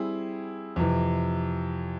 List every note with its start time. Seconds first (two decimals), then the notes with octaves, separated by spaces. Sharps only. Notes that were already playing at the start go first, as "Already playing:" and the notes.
Already playing: G3 C4 E4 G#4
0.76 F2 C3 E3